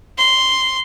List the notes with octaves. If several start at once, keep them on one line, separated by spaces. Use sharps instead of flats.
C6